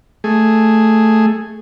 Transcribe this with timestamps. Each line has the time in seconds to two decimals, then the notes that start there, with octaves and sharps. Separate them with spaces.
0.24 A3 G#4